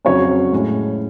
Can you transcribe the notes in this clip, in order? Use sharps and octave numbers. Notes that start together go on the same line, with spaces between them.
F2 C#3 F#3 C#4 C#5
A2 G#3 C#4